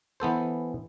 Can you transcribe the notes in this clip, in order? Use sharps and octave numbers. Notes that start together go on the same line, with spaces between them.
E3 B3 A4 C5